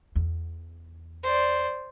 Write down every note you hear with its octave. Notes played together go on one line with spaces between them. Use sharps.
E2
C5 D5